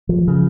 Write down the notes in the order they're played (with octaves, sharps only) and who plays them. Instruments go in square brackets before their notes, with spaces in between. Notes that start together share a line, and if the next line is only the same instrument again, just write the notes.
[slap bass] F3
C#3